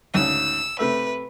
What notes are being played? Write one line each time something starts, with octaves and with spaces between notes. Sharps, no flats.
D2 G#2 C#3 E6
C3 A3 B4 E5